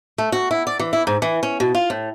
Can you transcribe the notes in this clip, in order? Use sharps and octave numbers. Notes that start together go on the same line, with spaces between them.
A3
F#4
E4
D5
E3
E4
G#2
E3
C#4
B2
F4
A2